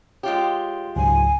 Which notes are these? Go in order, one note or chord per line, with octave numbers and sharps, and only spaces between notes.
G#3 F4 G4 C#5
C#2 G#2 C#3 F#3 G#5